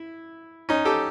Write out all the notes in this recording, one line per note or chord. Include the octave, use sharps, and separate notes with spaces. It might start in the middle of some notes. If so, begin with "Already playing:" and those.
Already playing: E4
C#4 D#4
G4 A4